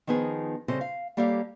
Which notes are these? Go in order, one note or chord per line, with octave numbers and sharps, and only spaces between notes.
D#3 F3 B3 D#4 G#4
C#3 G3 C4 A4 D#5
F5
G3 A#3 G4 A4 C#5 F5